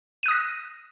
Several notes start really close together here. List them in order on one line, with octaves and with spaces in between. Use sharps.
D#7 F#6 D#6 A#6